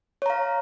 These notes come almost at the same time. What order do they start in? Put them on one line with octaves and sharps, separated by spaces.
C#5 A#5 F5